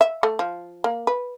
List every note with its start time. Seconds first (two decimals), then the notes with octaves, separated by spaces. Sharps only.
0.01 E5
0.23 A3
0.39 F3
0.84 A#3
1.07 B4